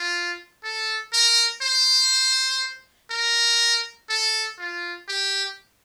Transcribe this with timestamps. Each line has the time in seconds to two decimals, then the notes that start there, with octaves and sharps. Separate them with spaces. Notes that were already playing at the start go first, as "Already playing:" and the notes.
Already playing: F4
0.63 A4
1.13 A#4
1.62 C5
3.11 A#4
4.10 A4
4.59 F4
5.09 G4